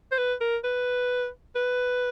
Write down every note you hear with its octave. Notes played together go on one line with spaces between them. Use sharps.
C5
B4
A#4
B4
B4